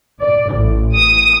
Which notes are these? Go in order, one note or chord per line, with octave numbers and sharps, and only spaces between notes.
D5
A1
D#6